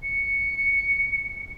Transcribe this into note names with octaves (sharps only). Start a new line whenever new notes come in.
C#7